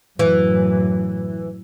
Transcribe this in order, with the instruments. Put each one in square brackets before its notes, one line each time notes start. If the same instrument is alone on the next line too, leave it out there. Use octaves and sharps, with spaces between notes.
[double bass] F#2 A2 [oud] E3